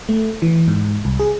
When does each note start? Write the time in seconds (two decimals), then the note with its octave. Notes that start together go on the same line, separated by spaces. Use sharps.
0.09 A3
0.42 E3
0.68 G#2
1.05 C2
1.19 G#4